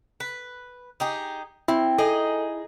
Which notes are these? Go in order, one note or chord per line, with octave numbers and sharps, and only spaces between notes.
B4
D#4 G4 G#4
C4 E4
D#4 G#4 A4 D#5